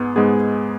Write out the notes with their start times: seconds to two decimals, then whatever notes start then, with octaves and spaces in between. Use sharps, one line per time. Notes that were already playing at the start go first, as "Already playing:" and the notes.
Already playing: G#2 G#3 B3 G#4
0.16 G#2 G#3 B3 G#4